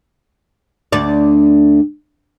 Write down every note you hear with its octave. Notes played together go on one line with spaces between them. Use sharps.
D2 D5